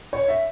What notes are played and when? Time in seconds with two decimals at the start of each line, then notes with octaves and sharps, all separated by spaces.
0.13 C#5
0.28 E5